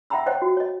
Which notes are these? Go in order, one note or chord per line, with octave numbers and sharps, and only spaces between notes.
E5 F#5 G5 A#5 B5 E6
C5 C#5 D#5 F#5 G5
F#4
C#5 D#5